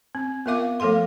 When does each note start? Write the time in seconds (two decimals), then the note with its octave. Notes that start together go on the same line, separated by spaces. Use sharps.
0.15 C4
0.46 B3 F4 A#4 E5 F5 D6
0.80 F3 A3 A4 F5 C6